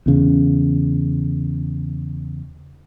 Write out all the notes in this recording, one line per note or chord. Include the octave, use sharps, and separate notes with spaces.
E2 C#3